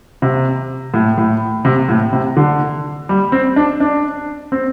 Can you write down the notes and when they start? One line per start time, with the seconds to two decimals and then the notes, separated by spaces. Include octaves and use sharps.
0.22 C3
0.94 A2
1.18 A2
1.65 C3
1.89 A2
2.13 C3
2.37 D3
3.09 G3
3.32 C4
3.56 D4
3.80 D4
4.52 C4